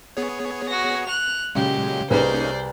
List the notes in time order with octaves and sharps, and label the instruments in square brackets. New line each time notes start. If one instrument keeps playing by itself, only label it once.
[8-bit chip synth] B3 G#4 C#5
[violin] F#4 A#6
F#6 F7
[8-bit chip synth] A#2 F#3 G#3 [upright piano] C#3 [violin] G4
[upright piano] C2 G#4 B4 [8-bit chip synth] A#3 C#4 D#4 [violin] C5 D5